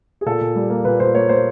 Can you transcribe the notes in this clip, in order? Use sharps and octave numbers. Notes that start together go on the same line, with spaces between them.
G#4
A#2 A4
A#2
G3
A#3
A#2 B4
A#2 C5
A#3 C#5
A#3 C5